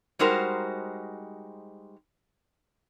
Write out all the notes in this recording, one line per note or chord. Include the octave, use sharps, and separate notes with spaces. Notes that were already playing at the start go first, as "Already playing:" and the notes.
G3 G#3 D#4 F#4 A#4 C5